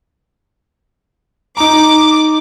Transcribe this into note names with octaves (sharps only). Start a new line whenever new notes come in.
D#4 A#5 D6